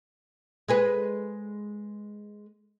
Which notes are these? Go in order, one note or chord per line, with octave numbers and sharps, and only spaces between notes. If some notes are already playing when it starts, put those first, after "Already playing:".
G#3 G#4 B4